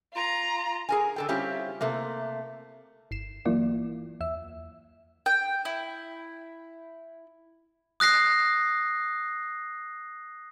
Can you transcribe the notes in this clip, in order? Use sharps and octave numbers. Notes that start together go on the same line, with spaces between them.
F4 A#5
G#4 A#4 G#5
D3 A4 G5
G3 C4 C#4 E4 F4 G4
C3 A3 A#3
G1 C7 E7
E3 F#3 A#3 E4 F4 D5
E2 E5 E6
G5
E4
D#6 F#6 A#6 C7